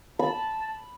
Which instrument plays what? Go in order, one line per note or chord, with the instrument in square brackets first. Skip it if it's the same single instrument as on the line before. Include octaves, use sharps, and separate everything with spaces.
[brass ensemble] A5 [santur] B5